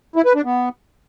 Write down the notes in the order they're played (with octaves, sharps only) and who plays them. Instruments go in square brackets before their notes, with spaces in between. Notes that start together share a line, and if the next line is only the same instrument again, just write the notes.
[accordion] E4
B4
D4
B3